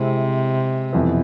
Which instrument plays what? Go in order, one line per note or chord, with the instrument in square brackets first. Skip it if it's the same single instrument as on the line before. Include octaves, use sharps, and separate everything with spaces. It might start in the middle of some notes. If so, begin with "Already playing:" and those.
Already playing: [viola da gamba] C3 [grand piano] G#3 C4 E4
[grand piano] F2 E3 B3 [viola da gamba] B2